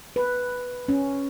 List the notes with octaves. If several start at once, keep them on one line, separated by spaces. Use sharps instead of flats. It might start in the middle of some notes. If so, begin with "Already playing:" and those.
B4
C#4